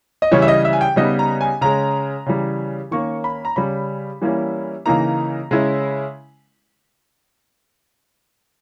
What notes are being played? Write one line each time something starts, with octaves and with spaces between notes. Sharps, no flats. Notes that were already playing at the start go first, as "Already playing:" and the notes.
D#5
C#3 E3 G3 C#5
E5
D#5
E5
G#5
G5
C#3 G3 B3 D#4 D#5
A#5
G#5
C#3 G#3 C#4 A#5
C#3 E3 G3
D#3 A#3 C#4 C#6
B5
A#5
C#3 G3 C#4 B5
E3 G3 A#3 C#4 E4
C#3 E3 A#3 D#4 A#5
C#3 G#3 C#4 E4